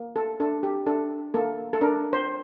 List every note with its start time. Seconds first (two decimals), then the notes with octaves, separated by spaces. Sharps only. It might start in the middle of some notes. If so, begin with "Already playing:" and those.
Already playing: A#3
0.16 A4
0.40 D4 A4
0.63 G4
0.86 D4 A4
1.34 A#3 A4
1.73 A4
1.81 D4 A#4
2.13 C5